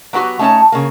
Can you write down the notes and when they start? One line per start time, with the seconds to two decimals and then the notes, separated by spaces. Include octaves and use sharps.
0.13 F#3 B3 C4 F#4 G4
0.39 A3 C#4 D#4 C#5 A5
0.72 C#3 A#3